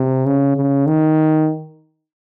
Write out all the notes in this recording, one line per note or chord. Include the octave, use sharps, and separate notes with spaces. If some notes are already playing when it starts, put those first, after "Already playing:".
Already playing: C3
C#3
C#3
D#3